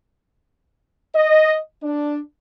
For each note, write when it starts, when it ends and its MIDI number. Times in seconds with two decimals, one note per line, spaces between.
1.15 1.56 75
1.83 2.19 62